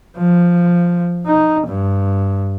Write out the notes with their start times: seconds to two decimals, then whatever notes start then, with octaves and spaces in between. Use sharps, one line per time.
0.17 F3
1.26 D#4
1.67 G2